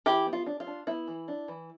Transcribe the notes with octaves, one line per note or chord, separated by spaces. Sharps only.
E3 E4 G4
B3
F4
D4
F4
D4
B3 E4
E3
D4
E3